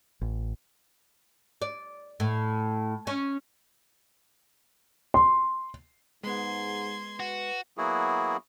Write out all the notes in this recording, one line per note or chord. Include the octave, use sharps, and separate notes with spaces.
A1
D5
A2
C#4
C6
G#2 G#3 B3 C6 G#6
F#4 B4
F#3 A#3 B3 E4 F#4 G#4